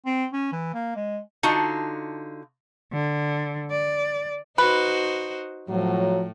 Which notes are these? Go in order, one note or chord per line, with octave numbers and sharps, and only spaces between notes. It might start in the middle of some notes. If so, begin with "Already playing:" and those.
C4
C#4
E3
A#3
G#3
D3 D#4 F4 F#4 A5
D3
D5
D#4 F#4 B4 C5
A2 F3 F#3